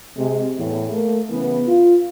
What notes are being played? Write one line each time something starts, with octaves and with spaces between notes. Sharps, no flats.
C3 G#3
E2 A2
A3 A#3
C#3 E3 B3
F4